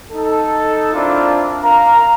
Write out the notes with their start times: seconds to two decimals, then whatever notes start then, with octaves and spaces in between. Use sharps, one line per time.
0.11 D#4 A4
0.94 C4 D4 E4 F4 A#4
1.63 A#4 F5 A#5